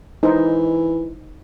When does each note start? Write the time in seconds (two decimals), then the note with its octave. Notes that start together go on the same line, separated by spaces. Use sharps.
0.23 E3 D#4 C5